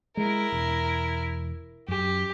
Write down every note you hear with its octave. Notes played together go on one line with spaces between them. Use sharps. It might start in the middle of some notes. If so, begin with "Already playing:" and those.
G#3 E4 A#4
E1
F#2 G4